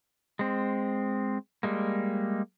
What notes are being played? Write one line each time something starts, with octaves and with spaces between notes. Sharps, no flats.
G#3 C4
G3 G#3 A#3